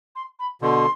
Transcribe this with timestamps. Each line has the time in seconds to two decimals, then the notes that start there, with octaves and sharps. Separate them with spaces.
0.15 C6
0.39 B5
0.61 B2 D3 C6